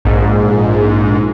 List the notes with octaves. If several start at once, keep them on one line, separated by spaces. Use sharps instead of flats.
A#1 G#2